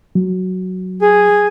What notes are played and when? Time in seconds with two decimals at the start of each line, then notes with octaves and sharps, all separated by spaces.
0.15 F#3
1.01 G#4